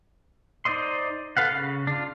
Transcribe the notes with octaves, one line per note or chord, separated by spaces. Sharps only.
D#4 C5 D5 D#5 C6
A4 B4 F5 F#5
C#3
D4 F4